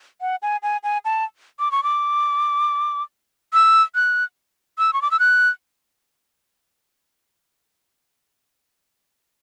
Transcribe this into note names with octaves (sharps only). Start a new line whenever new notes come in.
F#5
G#5
G#5
G#5
A5
D6
C#6
D6
E6
F#6
E6
C#6
D6
E6
F#6